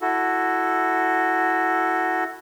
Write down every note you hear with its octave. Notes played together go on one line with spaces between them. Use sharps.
E4 F#4 A4